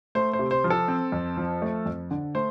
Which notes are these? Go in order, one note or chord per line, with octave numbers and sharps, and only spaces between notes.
A3 C5
C5
C3
C5
F3
A4
C4
F2
F3
A3
F2
D3
A3 C5